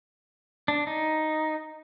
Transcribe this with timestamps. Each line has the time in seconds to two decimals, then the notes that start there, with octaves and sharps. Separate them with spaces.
0.68 D4
0.87 D#4